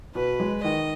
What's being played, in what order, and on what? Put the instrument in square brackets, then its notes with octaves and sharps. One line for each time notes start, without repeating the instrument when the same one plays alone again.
[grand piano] B2 [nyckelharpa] B4
[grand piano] G#3
[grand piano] D#3 [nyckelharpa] D#5